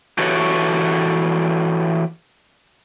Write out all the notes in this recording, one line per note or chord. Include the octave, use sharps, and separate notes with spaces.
E3 F#4 G4 A4 B4 C#5